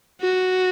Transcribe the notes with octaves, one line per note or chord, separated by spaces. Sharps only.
F#4